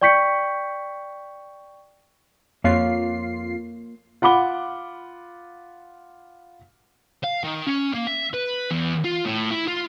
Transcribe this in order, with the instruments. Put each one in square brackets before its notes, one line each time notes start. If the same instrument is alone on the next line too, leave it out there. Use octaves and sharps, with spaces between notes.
[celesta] D5 G5 C#6 G6 B6 C#7
[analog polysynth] F2 F4 C7 [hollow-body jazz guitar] A#3 C#5 F5
[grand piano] F4 F#5 B5 D6 G7
[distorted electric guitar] F5
D#3
C#4
A#3
E5
B4
E2
F4
A2
E4
F4